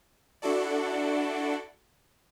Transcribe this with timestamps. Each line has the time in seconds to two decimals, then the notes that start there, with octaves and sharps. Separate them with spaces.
0.42 D4 E4 F#4 A4 D5